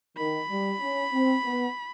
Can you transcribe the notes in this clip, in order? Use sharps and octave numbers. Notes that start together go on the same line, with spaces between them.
D#3 B5
G3
C#4
C4
B3